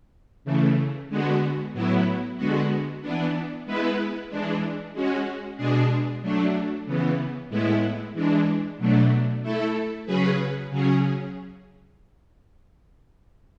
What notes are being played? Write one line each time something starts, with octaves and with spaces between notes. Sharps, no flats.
C#3 E3 A3
D3 G#3 B3 F#4
A2 F#3 B3 E4
D3 G#3 B3 F#4
E3 B3 D4
G#3 B3 E4 B4
E3 G#3 D4
G#3 C#4 F#4
B2 G#3 D4 G#4
F#3 A3 D4
C#3 E3 B3
A2 G#3 B3 E4
E3 G#3 D4
B2 F#3 A3 D4
A3 E4 A4
C#3 F#3 C#4 G#4 B4
C#3 F#3 C#4 G#4